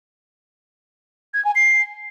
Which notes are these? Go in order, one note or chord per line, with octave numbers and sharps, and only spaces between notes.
G#6
G#5
C7